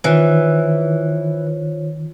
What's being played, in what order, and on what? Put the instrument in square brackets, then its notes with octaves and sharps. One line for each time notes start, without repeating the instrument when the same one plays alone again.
[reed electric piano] D#3 [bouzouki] E3 [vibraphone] F4 C5 C#5